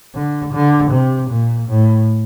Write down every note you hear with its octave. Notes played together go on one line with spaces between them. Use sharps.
D3
D3
C3
A#2
A2